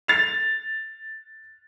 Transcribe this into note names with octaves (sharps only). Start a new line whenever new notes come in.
A6 F7